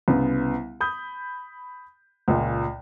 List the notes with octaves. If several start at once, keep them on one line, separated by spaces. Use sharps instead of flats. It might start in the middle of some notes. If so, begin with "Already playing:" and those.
C2 C#3 B3
B5 D#6 G6
C#2 A#2